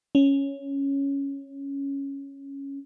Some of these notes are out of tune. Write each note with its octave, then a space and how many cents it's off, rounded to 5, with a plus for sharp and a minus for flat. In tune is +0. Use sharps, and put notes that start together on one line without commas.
C#4 +0